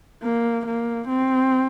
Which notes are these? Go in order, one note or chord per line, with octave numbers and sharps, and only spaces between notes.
A#3
A#3
C4